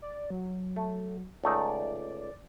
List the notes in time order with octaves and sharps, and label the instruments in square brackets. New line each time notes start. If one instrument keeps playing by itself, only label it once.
[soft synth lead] D5
F#3
[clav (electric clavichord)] A3
[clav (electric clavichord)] C#2 A3 D#4 [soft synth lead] D5